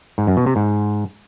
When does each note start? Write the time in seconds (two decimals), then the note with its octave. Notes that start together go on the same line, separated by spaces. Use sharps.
0.18 G#2
0.27 F#2
0.37 B2
0.46 C3
0.56 G#2